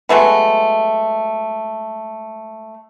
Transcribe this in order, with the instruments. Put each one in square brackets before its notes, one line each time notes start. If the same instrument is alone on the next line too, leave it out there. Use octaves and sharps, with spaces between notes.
[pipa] F#3 G#3 A3 B3